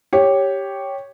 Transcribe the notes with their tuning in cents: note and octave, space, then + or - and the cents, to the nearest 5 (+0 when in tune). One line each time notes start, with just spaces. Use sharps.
G4 +0 C#5 +0